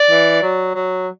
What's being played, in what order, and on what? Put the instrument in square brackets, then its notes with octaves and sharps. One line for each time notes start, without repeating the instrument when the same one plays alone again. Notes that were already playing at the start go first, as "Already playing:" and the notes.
Already playing: [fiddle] D5
[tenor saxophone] E3
F#3
F#3